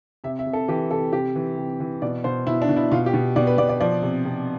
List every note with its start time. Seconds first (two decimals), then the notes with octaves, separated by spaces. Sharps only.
0.24 C3 E5
0.39 E5
0.46 C3
0.53 A4
0.68 E3 G4
0.91 C3 A4
1.13 C3 G4
1.35 E3
1.58 C3
1.80 E3
2.02 B2 D5
2.24 B2 C5
2.47 B2 E4
2.62 D4
2.69 B2
2.76 E4
2.92 B2 F4
3.06 G4
3.14 B2
3.36 B2 D5
3.47 B4
3.58 B2 D5
3.69 D5
3.81 F3 D5
4.02 C3
4.25 C3